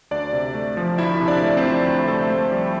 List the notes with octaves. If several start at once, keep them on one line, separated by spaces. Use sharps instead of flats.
D2 D4 D5
C3
A3
F3
D2 E4 E5
C3
D4 D5
A3
C4 C5
F3
D2
C3 A3 A4
A3 A4
F3 G3 G4